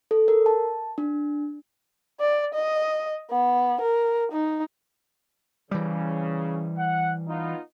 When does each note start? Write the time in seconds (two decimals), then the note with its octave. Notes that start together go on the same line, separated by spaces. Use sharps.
0.11 A4
0.28 A#4
0.46 A5
0.98 D4
2.20 D5
2.54 D#5
3.31 B3
3.81 A#4
4.32 D#4
5.71 C#3 E3 G3
6.78 F#5
7.28 B3 D#4 F4